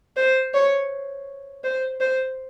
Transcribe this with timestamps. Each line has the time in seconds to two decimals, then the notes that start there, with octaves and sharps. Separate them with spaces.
0.17 C5
0.54 C#5
1.64 C5
2.00 C5